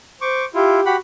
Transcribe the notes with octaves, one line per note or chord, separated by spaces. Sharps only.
C5 C#6 D6
E4 F4 G4
F#4 G4 F#5 B5